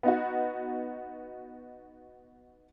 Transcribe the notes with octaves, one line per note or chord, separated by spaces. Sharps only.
B3 D#4 F#4